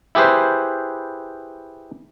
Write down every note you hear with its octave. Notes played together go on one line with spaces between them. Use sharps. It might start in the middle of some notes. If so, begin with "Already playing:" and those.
E4 G4 G#4 B4 C5